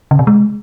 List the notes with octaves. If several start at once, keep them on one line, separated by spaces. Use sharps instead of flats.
C#3
C3
G#3